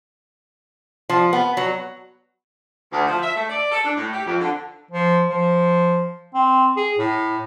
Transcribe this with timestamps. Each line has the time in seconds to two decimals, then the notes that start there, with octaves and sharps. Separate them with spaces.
1.10 F3
1.33 B3
1.57 F#3
2.92 D2
3.07 F3
3.22 E5
3.36 A3
3.50 D5
3.72 A4
3.85 D4
3.96 A2
4.13 G4
4.26 F2
4.40 D3
4.91 F3
5.29 F3
6.34 C4
6.77 G#4
6.98 A2